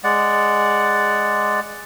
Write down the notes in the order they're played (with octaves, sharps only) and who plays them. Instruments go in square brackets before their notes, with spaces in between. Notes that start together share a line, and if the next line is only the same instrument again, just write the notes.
[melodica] G#3 D5 F#5